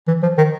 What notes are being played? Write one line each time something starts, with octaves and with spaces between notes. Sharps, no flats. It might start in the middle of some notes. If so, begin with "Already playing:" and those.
E3
F3
D#3